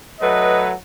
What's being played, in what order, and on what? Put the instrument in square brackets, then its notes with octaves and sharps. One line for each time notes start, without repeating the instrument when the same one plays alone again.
[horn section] F#3 A3 B4 [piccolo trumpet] D#5